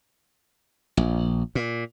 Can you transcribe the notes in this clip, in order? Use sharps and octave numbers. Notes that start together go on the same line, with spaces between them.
A#1
A#2